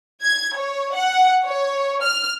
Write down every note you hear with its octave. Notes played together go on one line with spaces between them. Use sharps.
G#6
C#5
F#5
C#5
F6